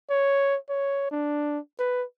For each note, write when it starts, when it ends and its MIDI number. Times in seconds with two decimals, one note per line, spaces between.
0.10 0.57 73
0.69 1.09 73
1.11 1.59 62
1.79 2.04 71